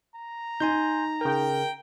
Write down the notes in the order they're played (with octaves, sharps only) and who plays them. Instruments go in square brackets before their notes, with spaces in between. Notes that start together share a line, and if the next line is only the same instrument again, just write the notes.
[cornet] A#5
[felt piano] D#4 [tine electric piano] G#5 C6 G6
[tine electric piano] C#3 A#4 [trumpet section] G5